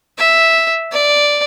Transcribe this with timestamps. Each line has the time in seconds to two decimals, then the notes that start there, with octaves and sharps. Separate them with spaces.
0.18 E5
0.91 D5